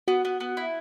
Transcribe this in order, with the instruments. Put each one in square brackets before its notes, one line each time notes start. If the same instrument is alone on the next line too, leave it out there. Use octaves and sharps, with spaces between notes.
[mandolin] B3 [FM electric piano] F#4
[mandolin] B3
B3
E4